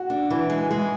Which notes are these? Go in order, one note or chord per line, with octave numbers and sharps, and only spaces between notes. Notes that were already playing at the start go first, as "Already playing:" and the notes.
Already playing: F#4
D4
E3
G#3
G#3